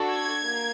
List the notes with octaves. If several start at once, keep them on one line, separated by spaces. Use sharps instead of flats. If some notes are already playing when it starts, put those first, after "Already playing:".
Already playing: D4 F#4 A4
G#6
A#3